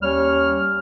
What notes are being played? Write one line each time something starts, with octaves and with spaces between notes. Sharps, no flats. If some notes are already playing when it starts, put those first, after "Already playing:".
D#2 G3 C#4 C#5 F6